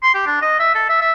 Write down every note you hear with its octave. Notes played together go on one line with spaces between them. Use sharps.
C6
G4
D4
D#5
E5
A4
E5
E5